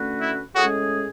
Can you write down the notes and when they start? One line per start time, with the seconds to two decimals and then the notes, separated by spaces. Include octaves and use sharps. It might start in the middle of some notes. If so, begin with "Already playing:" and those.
Already playing: D3 A3 C#4 F#4 B4
0.21 E4
0.55 A2 G#3 C#4 F#4 G#4